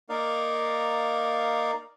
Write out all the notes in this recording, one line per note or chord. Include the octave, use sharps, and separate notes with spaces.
A#3 D#4 A#4 D5 F5